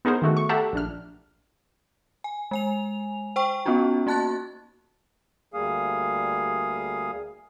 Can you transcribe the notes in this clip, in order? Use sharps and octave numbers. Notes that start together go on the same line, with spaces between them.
B3 D#4 G#4 A#4 C5
D#3 A3 F#4
C#6
G4 A4 E5 F#5 A5 A#5
A#1 D4 F6
G#5
G#3 G#5 F7
C5 G5 C#6
B3 C#4 D#4 F4 F#4
A#3 F#4 A5 F#6 A6
D2 G3 A#3 G#4 F5 D#6